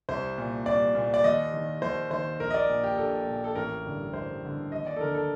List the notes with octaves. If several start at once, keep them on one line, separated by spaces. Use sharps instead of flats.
C2 C5
A#2
C2 D5
A#2
D5
D#2 D#5
D#3
D#2 C5
D#3 C5
A#1 A#4
D#5
D5
A#2
G4
A#1 A4
A#2
A4
A1 A#4
G2 D3
A1 C5
G2 D3
D#2 D#5
D5
A4
D3 A#4
A4